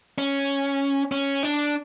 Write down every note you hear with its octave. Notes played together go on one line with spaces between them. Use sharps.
C#4
C#4
D4